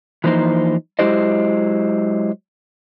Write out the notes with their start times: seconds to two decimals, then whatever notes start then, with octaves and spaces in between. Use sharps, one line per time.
0.24 E3 F3 A#3 D#4 C5
0.99 F#3 G#3 E4 G4 C5 D#5